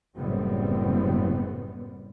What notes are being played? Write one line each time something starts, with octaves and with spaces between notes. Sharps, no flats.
F#1 F#2 A2 G3 B3 C4